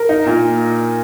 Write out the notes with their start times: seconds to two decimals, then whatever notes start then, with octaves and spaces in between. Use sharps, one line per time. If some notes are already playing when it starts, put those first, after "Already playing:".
Already playing: A#4
0.09 D#4
0.26 A#2